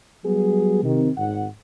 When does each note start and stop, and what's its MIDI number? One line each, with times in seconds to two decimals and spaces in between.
0.24 0.81 54
0.24 0.81 55
0.24 0.81 59
0.24 0.81 68
0.83 1.09 48
0.83 1.09 51
1.17 1.44 32
1.17 1.44 78